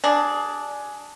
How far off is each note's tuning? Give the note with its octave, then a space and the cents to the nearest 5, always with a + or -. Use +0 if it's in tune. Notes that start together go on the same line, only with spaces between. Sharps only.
G3 -35 D4 +0 G#4 +15